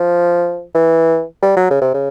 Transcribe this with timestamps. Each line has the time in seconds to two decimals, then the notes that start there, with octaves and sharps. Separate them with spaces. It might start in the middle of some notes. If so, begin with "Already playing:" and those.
Already playing: F3
0.75 E3
1.42 G3
1.57 F#3
1.71 C#3
1.82 C3
1.94 C#3